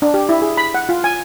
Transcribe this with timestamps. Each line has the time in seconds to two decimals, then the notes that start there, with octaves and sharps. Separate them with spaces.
0.02 D4
0.14 G4
0.29 E4
0.42 G#4
0.57 B5
0.74 F#5
0.89 F4
1.04 G#5